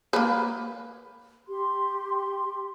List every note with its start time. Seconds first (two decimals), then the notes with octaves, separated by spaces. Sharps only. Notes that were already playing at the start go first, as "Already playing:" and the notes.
0.13 A#3 B4
1.48 G4 C6